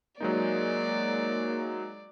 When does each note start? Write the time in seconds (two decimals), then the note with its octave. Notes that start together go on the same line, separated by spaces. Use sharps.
0.20 F#3 G#3 A#3 D#4 D5